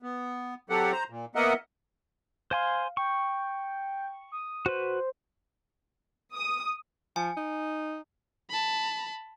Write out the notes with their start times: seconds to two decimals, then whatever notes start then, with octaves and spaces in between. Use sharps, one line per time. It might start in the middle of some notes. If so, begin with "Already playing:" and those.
0.02 B3
0.70 F#3 C4 G4 A4 F#5
0.92 C5 A#5
1.10 A#2
1.35 A#3 B3 A#4 D#5 E5 F#5
2.51 C5 F5 G#5 C6
2.97 G5 C#6
4.32 D#6
4.66 F#4 B4 C5
6.35 D#6
7.16 F3 G#5
7.37 D#4
8.50 A5 B5